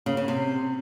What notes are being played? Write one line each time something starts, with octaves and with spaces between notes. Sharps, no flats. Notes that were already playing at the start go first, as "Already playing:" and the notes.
C#3
C#3
C3